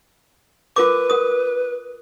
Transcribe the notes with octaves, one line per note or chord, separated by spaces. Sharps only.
F4 A#4 B4 D6
A#4 D#6